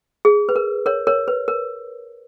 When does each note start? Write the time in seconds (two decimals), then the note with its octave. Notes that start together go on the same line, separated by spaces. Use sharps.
0.25 G#4
0.49 B4
0.56 A#4
0.86 A#4 C#5
1.07 A#4 C#5
1.28 B4
1.48 A#4